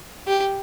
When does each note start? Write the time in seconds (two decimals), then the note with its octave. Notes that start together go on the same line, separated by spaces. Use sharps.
0.27 G4